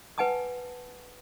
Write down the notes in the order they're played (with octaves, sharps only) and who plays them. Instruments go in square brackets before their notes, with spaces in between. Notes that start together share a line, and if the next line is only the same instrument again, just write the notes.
[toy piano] B4 F#5 G#5 A5 D#6